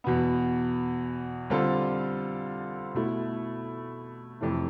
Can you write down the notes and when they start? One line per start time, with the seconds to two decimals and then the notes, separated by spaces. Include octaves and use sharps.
0.04 E2 B2 B3
1.50 D3 G3 C4 F4 A4
2.95 B2 A3 E4
4.41 F2 C3 E3 A3